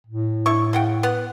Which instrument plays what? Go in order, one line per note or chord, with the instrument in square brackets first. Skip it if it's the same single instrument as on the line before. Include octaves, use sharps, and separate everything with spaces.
[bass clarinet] A2
[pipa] D3 E4 C#6
C#3 F#5 G5
B3 F#5